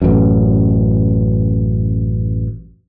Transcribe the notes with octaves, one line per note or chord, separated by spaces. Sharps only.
A1 F#2